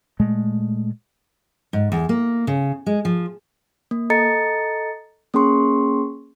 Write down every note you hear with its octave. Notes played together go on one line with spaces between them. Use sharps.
A#2 G#3 A3
G#2
E2
A#3
C#3
G#3
F3
A#3
A4 D#5 A#5 A6 C#7
A#3 C#4 G#4 C6 C#6